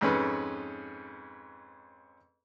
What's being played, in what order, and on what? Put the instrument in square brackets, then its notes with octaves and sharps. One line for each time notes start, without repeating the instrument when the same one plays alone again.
[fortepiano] F2 G#2 C#4 B4